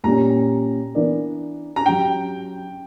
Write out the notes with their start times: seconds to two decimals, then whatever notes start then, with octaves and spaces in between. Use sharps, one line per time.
0.04 A#2 G3 C#4 A#5
0.95 E3 B3 D4 A#4 D5
1.76 A#5
1.86 F#3 C#4 G4 G5